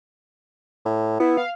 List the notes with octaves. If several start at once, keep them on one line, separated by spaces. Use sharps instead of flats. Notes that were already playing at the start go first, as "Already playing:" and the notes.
A2
B3 E4
F5